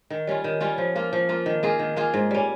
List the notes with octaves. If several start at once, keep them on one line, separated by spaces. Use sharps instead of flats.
D#3
G3 C#4 F4
D#3
G3 C#4 F4
F3
A#3 F4
F3
A#3 F4
D#3
A#3 F4 G#4
D#3
A#3 F4 G#4
G#2
G3 C#4